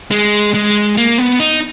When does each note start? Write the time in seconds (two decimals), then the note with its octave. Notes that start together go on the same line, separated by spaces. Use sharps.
0.11 G#3
0.54 G#3
0.97 A#3
1.18 B3
1.40 D#4